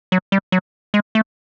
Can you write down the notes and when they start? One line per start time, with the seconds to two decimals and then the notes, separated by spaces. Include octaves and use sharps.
0.12 F#3
0.32 G3
0.52 F#3
0.94 G#3
1.15 A3